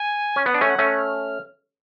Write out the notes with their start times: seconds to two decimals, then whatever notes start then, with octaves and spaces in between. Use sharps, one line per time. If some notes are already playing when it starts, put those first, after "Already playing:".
Already playing: G#5
0.36 C#4
0.45 B3 F#5
0.54 D4
0.58 A3 C#4 G#5
0.70 F#5
0.79 A3 C#4 F6
0.91 F#6
0.98 F6